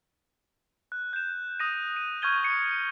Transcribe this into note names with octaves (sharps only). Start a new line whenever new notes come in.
F#6
G6 E7
D#6 A#6 D#7
D#7
C#6 F6 G6 G#6 D#7 G7
C#7